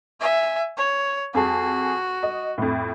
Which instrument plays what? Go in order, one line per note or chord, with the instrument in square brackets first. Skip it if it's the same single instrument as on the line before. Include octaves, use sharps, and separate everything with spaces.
[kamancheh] E5 G#5
C#5
[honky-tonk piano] F2 G#4 A5 [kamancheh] F#4
[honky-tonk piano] D#5
F2 A2